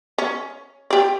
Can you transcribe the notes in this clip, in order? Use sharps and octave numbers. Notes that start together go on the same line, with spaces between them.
C#4
G4 D5